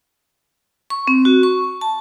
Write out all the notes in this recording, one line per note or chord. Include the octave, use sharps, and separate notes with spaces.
C#6
C4
F#4
C#6
A5